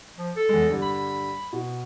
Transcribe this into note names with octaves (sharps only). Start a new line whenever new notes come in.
F3
A4
E2 G#3
G2 D3 G3
B5
B2